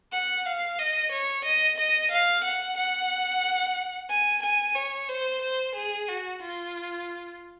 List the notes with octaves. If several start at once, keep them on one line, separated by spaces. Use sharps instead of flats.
F#5
F5
D#5
C#5
D#5
D#5
F5
F#5
F#5
G#5
G#5
C#5
C5
C5
G#4
F#4
F4